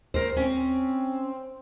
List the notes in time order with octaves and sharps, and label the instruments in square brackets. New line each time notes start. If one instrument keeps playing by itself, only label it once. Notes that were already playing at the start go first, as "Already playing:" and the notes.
[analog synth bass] D#2 [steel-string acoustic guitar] A#4 C5
[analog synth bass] C4 [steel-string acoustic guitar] C#4